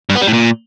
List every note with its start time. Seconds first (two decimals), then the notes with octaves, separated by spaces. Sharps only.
0.09 G2
0.15 B3
0.21 G3
0.27 A2
0.33 A#2